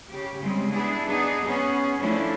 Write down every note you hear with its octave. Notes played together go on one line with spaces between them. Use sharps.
C#3 G4
C#3 G3 G#3 C4
B3 D4 E4 G#4
B3 D4 D#4 G#4
B3 C#4 G#4
F3 A3 C#4 D4 E4